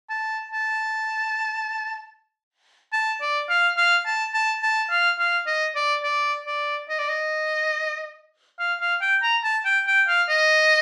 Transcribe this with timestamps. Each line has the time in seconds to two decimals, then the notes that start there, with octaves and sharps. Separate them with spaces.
0.09 A5
0.52 A5
2.93 A5
3.21 D5
3.49 F5
3.77 F5
4.05 A5
4.34 A5
4.63 A5
4.90 F5
5.19 F5
5.47 D#5
5.75 D5
6.03 D5
6.46 D5
6.89 D#5
6.99 D5
7.09 D#5
8.59 F5
8.80 F5
9.01 G5
9.22 A#5
9.43 A5
9.65 G5
9.87 G5
10.08 F5
10.29 D#5